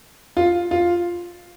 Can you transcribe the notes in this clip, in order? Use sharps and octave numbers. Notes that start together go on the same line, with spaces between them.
F4
F4